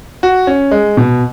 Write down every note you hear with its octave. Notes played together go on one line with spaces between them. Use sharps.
F#4
C#4
G#3
B2